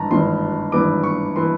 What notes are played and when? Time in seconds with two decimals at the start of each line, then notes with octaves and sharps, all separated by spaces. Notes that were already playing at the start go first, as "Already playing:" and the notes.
Already playing: G#1 G2 E3 A5 A#5
0.11 G#1 G2 E3 C6
0.72 G#1 G2 E3 D6
1.04 C#6
1.36 E3 C6